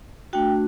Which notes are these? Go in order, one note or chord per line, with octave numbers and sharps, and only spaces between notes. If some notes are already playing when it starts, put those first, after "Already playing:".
A3 D4 F#4 G5